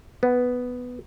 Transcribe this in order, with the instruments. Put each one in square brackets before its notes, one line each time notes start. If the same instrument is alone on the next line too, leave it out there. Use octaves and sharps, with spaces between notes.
[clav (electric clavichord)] B3